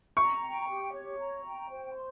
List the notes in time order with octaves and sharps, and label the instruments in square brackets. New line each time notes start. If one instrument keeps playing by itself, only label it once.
[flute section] A#5 [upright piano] C#6
[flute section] G5
G4
C#5
A#5
G5
C5
C6